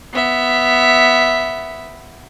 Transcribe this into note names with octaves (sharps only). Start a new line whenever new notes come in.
B3 E5